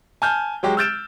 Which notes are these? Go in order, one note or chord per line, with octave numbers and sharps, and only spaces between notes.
G#5 A5 F6 G6
F#3 G#3 G4
E6 F6 G6 A6 D7 E7